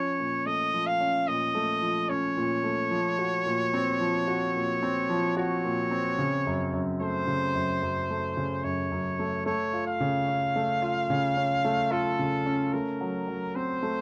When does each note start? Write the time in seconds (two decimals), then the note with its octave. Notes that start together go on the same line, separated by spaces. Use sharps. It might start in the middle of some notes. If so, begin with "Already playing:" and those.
Already playing: F3 C#4 C#5
0.19 A#2
0.46 A3 D#5
0.73 F3
0.87 F5
1.00 C#4
1.27 A#2 D#5
1.55 A3
1.82 F3
2.09 C#4 C#5
2.37 A#2
2.64 A3
2.91 F3
3.19 F#4
3.46 A#2
3.74 C4
4.00 F3
4.28 F#4
4.55 A#2
4.83 C4
5.10 F3
5.37 F#4 C#5
5.64 A#2
5.91 C4
6.19 C#3
6.47 F#2
6.73 F#2
7.01 A3 C5
7.27 C#3
7.55 F#2
7.83 F#2
8.10 A3
8.37 C#3
8.64 F#2 C#5
8.91 F#2
9.19 A3
9.46 A3 C#5
9.73 F4
9.87 F5
10.00 C#3
10.28 C#4
10.56 A3
10.82 F4
11.10 C#3
11.37 C#4
11.65 A3
11.91 F4 A4
12.19 C#3
12.46 C#4
12.73 A3 A#4
13.01 F#3
13.28 F#3
13.55 C4 C5
13.83 A3